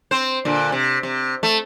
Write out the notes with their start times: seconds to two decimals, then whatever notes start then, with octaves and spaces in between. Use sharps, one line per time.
0.11 C4 C5
0.45 A#2 D3
0.72 C3
1.03 C3
1.43 A3